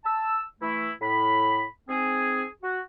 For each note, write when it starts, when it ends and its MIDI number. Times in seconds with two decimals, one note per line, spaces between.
0.05 0.42 81
0.05 0.42 88
0.61 0.92 52
0.61 0.92 57
0.61 0.92 64
1.01 1.66 45
1.01 1.66 83
1.89 2.46 44
1.89 2.46 60
1.89 2.46 68
2.63 2.80 66